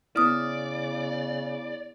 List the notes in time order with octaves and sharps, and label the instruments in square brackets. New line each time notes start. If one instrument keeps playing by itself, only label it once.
[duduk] C#3 [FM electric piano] B3 E4 [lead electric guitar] D5 [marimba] D#6 F6